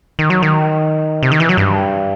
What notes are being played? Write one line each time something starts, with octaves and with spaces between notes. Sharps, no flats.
D#3
F#3
D#3
C3
D#3
E3
F#3
G2